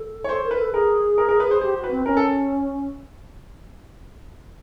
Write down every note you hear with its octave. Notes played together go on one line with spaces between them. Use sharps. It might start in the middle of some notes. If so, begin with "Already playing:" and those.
Already playing: A4
C#5
A4 C5
A#4
B4
A4
G#4 A#4
A#4
A#4
B4
C5
G4 C5
F#4
B4
C4
C#4 A#4
A4